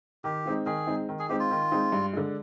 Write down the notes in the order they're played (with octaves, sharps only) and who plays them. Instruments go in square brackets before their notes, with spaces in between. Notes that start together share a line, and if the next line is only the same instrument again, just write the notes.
[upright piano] D#3 [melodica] G4
[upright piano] G#3 C4 D#4
[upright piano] D#3 [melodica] G#4
[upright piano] G#3 C4 D#4
D#3
[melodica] G#4
[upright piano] G#3 C4 D#4 [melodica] G4
[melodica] F4
[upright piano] D#3
G#3 C4 D#4
G2
D3 G#3